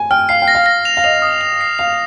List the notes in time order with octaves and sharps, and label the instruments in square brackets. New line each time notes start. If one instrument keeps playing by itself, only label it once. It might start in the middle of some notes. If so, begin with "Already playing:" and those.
Already playing: [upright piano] G#5
[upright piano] G5 [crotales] F6
[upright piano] F5 [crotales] C7
[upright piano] G5
[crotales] A#6
[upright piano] F5
[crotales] A#6
F7
[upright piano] F5
[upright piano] D#5 [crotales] F7
[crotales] D#6
F7
C7
[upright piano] F5 [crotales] F7